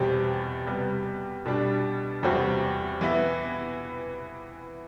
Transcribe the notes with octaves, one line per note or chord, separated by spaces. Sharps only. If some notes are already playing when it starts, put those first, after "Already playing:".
Already playing: E2 B2 G3 C4 G4
C3 G3 B3
B2 G3 D4
E2 C3 G3 C4 F#4
E3 B3 E4